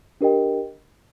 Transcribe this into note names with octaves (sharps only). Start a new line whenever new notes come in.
D4 G4 A#4 D#5 G5